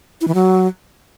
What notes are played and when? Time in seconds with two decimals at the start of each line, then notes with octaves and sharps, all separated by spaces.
0.21 E4
0.28 E3
0.34 F#3